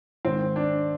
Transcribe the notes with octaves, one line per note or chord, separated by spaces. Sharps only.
G#2 D#3 C4
D4